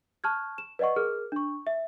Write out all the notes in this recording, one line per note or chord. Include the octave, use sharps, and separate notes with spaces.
A5 C#6 F6 F#6 G#6
E7
B4 D5 D#5 F#5 C#6
G#4 A#4 F6
D4 C#6
E5